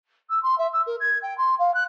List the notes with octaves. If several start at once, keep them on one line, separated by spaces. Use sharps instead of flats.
E6
C6
E5
E6
A#4
G#6
G5
C6
F5
F#6